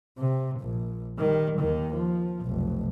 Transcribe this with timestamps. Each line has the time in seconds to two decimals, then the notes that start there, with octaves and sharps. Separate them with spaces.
0.19 C3
0.60 A#1
1.19 D#3 G3
1.58 D#2 D#3
1.93 F3
2.41 F1 B1